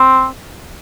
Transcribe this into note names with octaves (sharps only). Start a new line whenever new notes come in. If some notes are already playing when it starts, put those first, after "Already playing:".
Already playing: C4